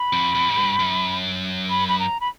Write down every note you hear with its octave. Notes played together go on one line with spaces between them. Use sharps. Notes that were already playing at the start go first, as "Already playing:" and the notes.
Already playing: B5
F2
F2
G#2
G2
F#2
B5
B5
A#5
B5